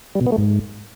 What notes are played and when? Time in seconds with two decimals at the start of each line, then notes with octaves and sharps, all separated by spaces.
0.15 G3
0.21 B2
0.26 B3
0.32 A3
0.38 G#2